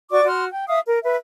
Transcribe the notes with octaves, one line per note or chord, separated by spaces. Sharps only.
F#4 D5 C#6 D6
F#4 C6 F6
G5
E5 F5 D#6
A#4
B4 E5